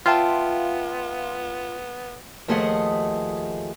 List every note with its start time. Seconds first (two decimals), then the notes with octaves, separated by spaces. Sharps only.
0.06 B3 F4 E5 G5 A5
2.48 D#2 F3 A3 G#4 D#5 F#5